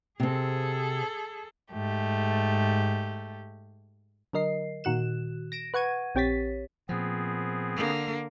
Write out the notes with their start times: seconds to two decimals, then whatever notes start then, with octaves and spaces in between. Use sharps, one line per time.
0.20 C3 C4 G#4 A4
1.73 G#2 A3 G4
4.33 D3 F#3 A#4 D#5 C7
4.84 A#2 D#3 F#4 F#6 E7
5.52 A#6 D7 E7
5.74 B4 F#5 C#6 G#6 D#7
6.15 A#1 C4 G4 C#5 A6 B6
6.89 A#2 F3 B3 C4 G#4
7.77 D3 A#3